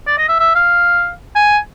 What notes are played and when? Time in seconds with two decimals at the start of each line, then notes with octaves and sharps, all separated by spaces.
0.07 D5
0.18 D#5
0.29 E5
0.39 E5
0.55 F5
1.35 G#5